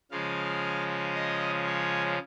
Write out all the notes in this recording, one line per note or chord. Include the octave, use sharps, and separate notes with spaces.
C#3 F3 G#3 C#4 F5
D#5
C#5